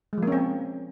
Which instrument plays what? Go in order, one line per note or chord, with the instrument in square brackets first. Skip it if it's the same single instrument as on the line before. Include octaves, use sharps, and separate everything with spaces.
[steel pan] G#3
F3
A#3
C#4
C4